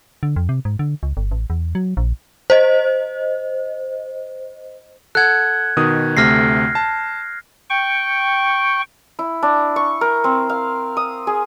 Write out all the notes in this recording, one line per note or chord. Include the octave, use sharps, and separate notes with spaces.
D3
F2
C3
G#2
D3
C#2
G1
A1
E2
F#3
A#1
C5 D#5
A4 F#5 F#6 G#6
B2 D#3 D#6
D2 C3 A3 F6 A#6 C7
A5
G5 C#6
E4
D4
C#6
A#4
C4
F5
D#6
G#4